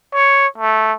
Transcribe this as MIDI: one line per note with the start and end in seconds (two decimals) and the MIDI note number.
0.14 0.47 73
0.58 0.93 57